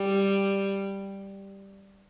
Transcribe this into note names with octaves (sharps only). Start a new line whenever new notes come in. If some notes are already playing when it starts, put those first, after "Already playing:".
Already playing: G3